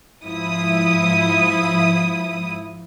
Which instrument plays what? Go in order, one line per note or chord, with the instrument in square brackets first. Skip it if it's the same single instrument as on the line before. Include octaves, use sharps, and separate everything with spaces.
[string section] G#2 F3 E4 D#6